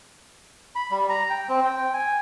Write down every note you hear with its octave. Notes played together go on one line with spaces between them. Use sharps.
B5
G3
A#5
G5
C4
G5
G#5